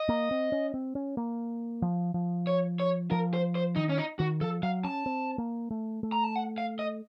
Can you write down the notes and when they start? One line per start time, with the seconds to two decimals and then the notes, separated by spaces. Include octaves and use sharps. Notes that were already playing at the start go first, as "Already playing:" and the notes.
Already playing: D#5
0.09 A#3
0.31 C4
0.52 C#4
0.74 C4
0.95 C#4
1.17 A#3
1.82 F3
2.14 F3
2.47 C#5
2.80 C#5
3.11 F3 A#4
3.34 C5
3.55 C5
3.76 D#3 D#4
3.89 C#4
3.98 D#4
4.19 D#3 F#4
4.41 F3 A4
4.63 F#3 F5
4.84 C#4 A5
5.06 C4
5.38 A#3
5.71 A3
6.03 A3
6.12 A#5
6.24 A5
6.36 F#5
6.58 F5
6.79 D#5